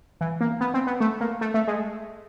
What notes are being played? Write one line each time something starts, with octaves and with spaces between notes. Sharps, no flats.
E3
A#3
B3
C4
B3
A3
A#3
A3
A3
G#3